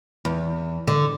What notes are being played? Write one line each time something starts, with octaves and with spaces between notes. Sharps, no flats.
E2
D3